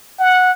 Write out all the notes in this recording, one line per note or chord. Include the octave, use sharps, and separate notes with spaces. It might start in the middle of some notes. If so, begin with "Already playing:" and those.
F#5